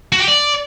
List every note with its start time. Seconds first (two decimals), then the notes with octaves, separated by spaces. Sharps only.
0.12 F#4
0.20 G4
0.28 D5